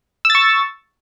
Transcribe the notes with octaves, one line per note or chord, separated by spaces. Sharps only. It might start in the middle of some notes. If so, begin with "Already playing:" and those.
C#6 E6 A6